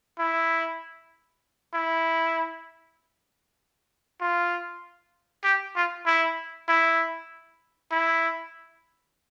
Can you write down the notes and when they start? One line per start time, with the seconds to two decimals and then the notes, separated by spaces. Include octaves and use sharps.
0.19 E4
1.74 E4
4.21 F4
5.44 G4
5.76 F4
6.06 E4
6.69 E4
7.92 E4